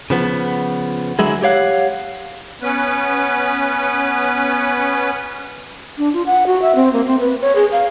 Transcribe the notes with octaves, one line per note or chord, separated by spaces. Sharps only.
C#3 F3 B3
D3 F#3 G#3 E4 G#4
G4 C#5 F5 F#5
B3 C#4 B4
D4
F4
F#5
F#4
E5
C4
A#3
C4
B4
C#5
G#4
F5